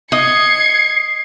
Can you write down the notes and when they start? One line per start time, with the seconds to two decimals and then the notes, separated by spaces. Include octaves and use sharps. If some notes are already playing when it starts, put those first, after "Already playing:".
0.12 D#5 G#6 C7 C#7